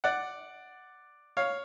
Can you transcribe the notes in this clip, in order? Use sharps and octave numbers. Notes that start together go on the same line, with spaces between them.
D5 F#5
C#5 F5